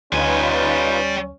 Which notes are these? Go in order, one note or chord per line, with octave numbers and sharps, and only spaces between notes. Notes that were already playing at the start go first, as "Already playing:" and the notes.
D2 G3 C#4 D#4 F4 B4 G#5